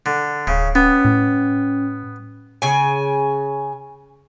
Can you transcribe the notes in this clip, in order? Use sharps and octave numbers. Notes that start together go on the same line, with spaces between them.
D3
D1 C#3
B3 C#4
A2
C#3 G#5